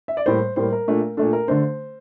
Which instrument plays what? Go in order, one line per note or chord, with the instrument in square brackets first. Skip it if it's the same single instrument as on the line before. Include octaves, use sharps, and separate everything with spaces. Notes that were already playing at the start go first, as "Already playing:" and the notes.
[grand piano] E5
D5
A2 G3 A#3 C5
A2 G3 A#3 C5
A#4
A#2 A3 D4
A#2 A3 D4 A4
A#4
D3 A3 D4 C5